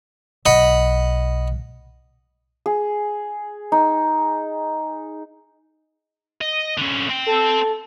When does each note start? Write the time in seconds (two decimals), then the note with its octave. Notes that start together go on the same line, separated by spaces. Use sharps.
0.46 B1 D#5 F#5 B5
2.66 G#4
3.72 D#4
6.41 D#5
6.78 D3 C#4
7.09 C4 G5
7.26 A4